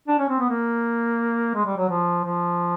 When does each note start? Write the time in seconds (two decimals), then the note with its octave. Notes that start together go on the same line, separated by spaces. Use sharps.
0.08 D4
0.19 C#4
0.29 C4
0.39 B3
0.49 A#3
1.54 G#3
1.66 G3
1.77 F#3
1.89 F3
2.24 F3